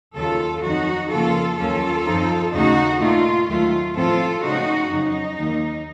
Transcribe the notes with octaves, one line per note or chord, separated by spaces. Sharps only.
D#2 C#3 F#3 F4 A4
F2 D#3 F#3 D#4 F#4
F2 C#3 F3 A#3 F4 A4
D#2 D#3 F#3 A#3 C#4 F4 A4
F#2 F3 C4 D#4
D#2 C#3 A3 D#4 F#4
A#2 A3 D#4 F4
D#2 D#3 F#3 A3 F4
A2 F3 C4 F4 A4
C#3 A3 C4 D#4 F#4
F2 C#3 F#3 D#4
D#2 D#3 A#3